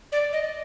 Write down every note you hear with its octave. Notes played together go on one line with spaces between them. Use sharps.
D5
D#5